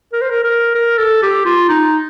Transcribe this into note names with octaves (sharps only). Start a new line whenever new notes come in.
A#4
C5
A#4
A#4
A#4
A4
G4
F4
D#4